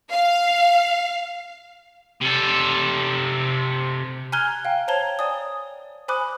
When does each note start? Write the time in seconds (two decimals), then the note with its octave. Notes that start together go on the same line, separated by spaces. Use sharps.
0.11 F5
2.21 C3 A4
4.32 G#5 A#5 F6 F#6 G#6 G7
4.65 F5 G5
4.88 C5 C#5 A5 A#5 G#6 G7
5.19 D5 G#5 D#6
6.08 C5 G#5 B5 D6 D#6 F#6